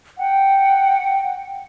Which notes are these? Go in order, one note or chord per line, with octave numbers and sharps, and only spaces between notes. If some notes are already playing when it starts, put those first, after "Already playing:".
F#5 G5